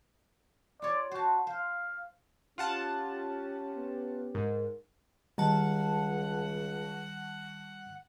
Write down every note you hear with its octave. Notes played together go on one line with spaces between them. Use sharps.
F4 C#5 D5
F#4 C5 A5
C5 F5
C#4 F4 G4 F#5 A5
B3
G#2 A#4
C#2 D#3 G3 F#5 A5